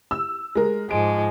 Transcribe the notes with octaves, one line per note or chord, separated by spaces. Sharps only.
E6
G#3 A#4
G#2 F3 G#3 D7